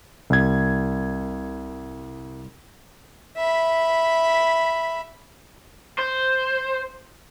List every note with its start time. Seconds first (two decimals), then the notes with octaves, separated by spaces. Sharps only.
0.30 C2 G#6
3.37 E5 B5
5.99 C5